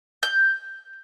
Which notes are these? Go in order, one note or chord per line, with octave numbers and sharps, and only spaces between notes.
G6